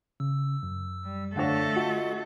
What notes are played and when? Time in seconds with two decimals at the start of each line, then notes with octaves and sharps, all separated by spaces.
0.20 C#3 E6
0.63 F#2
1.05 G3
1.36 D3 A3 D4 A4 C#5 F5 A#6
1.76 F4 F#4 D#5 F#5